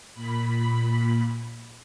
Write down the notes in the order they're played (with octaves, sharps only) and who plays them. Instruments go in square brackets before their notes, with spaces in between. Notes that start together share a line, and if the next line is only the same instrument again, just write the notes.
[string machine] A#2 B5